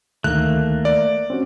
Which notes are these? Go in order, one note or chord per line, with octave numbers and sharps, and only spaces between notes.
D2 D#3 A3 A#3 F#6
D5
C4 C#4 F#4